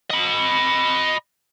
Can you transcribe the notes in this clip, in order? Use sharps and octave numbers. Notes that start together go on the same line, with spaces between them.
D#5 B5